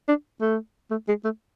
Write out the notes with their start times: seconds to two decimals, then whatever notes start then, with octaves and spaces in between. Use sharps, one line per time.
0.08 D4
0.41 A3
0.91 A3
1.08 G#3
1.24 A3